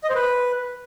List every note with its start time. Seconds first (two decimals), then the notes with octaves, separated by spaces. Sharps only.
0.04 D#5
0.09 C5
0.15 B4